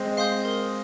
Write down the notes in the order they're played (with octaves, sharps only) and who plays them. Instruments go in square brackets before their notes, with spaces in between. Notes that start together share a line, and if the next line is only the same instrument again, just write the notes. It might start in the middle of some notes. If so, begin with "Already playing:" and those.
Already playing: [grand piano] G#3 C4
[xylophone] F5 C6 D#6 G6
A#4